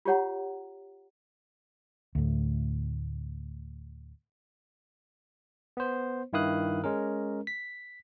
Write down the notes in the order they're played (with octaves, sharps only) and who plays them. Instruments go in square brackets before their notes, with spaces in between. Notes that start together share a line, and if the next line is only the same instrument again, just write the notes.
[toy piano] F4 G4 C#5 F#5 A#5
[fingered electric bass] D2 A2
[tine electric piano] B3 C5
G2 D#3 E4 F5 D#6 F#6
G#3 C#4 A#4
B6